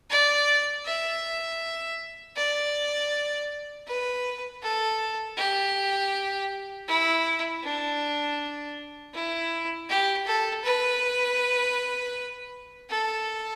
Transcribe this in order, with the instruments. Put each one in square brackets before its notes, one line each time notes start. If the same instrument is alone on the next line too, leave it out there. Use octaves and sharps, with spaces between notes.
[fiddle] D5
E5
D5
B4
A4
G4
E4
D4
E4
G4
A4
B4
A4